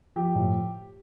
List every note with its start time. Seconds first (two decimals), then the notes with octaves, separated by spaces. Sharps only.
0.16 F3 G4
0.36 A2